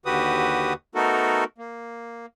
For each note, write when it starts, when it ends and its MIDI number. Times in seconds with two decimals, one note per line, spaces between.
0.06 0.73 39
0.06 0.73 50
0.06 0.73 66
0.06 0.73 67
0.06 0.73 71
0.06 0.73 87
0.95 1.44 57
0.95 1.44 59
0.95 1.44 63
0.95 1.44 66
0.95 1.44 69
0.95 1.44 70
1.58 2.26 58